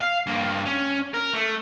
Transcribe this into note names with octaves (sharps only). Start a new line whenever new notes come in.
F5
G2 A#3
C#4
A#4
A3